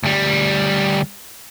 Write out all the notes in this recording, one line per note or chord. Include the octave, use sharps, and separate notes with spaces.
D2 G3